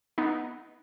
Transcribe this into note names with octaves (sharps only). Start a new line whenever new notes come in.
B3 D#4